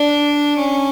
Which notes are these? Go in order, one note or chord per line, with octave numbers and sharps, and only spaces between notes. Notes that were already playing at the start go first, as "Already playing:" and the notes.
Already playing: D4
C#4